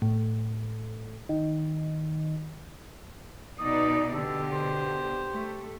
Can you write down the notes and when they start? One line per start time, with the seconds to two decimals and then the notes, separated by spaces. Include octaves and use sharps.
0.02 A2
1.29 D#3
3.59 B2 D#4 D5 D#6
4.14 B2 D3 G4 A4
4.53 C5
5.31 A3